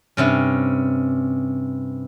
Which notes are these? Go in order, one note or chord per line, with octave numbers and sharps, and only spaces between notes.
G2 C3 C#4